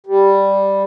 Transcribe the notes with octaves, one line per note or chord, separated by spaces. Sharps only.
G3